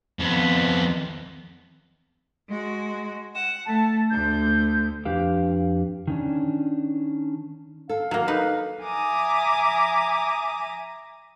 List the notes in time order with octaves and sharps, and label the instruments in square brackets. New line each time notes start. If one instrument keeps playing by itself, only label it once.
[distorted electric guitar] F2 B3
[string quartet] G#3 F#4
[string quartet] F#5 [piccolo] E7
[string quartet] A3 [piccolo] A5
[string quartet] D2 [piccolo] G6
[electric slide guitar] F2 D4 G4 B4 F5
D#3 C#4 D4
[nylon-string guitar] A4 [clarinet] F5
[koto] F#3 A#3
D#4 B4
[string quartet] E5 G#5 A#5 D6 D#6